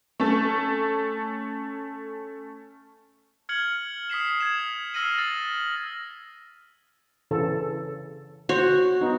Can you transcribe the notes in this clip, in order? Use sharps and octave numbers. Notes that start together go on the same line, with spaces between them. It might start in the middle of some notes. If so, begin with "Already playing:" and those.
A3 C#4 A4
F6 G#6 C#7 F#7
D#6 B6 C7 E7
G#6 E7
E6 F6 A#6 C7 D#7 F#7
A6 F#7
C#3 E3 A4
F#4 C5 C#5
B3 D#4